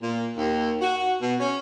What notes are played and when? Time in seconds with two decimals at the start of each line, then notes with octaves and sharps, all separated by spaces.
0.02 A#2
0.37 D#2
0.81 F#4
1.21 B2
1.39 C#4